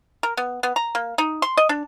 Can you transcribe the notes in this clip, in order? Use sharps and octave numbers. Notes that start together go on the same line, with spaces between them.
A#4
B3
B3
A#5
A#3
D#4
C6
D#5
D4